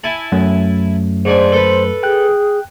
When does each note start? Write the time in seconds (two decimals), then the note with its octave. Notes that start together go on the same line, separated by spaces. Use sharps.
0.04 E4 G#5 A5
0.32 F#2 F#3 A3
1.25 G#2 D4 C5 G#5
1.52 A4 B4
2.03 G#4 G5 F#6